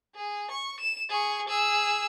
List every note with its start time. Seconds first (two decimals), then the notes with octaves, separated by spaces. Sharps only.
0.15 G#4
0.50 C#6
0.80 E7
1.10 G#4 C#6
1.48 G#4 E6